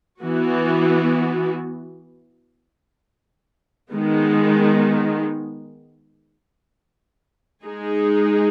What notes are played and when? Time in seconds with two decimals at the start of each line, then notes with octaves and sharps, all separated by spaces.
0.21 E3 B3 F#4
3.92 D#3 G#3 B3
7.64 G#3 D#4 G#4